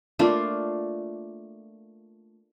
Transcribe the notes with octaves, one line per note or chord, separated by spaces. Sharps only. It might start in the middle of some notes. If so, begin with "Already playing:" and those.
A3 A#3 D4 F4